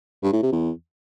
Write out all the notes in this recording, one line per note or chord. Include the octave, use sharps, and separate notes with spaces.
G2
A2
C3
E2